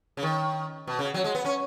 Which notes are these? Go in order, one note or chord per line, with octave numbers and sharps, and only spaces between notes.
C#3
D#3
B2
C#3
F#3
G#3
B3
C#4